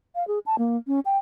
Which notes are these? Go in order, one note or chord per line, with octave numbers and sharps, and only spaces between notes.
F5
G#4
A5
A#3
C#4
G5